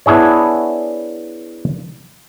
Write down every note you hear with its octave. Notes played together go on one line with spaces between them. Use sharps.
B3 D4 E4 G#4 C#5